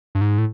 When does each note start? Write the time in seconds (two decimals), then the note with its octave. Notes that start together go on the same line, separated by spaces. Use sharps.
0.15 G2
0.21 G#2
0.38 A2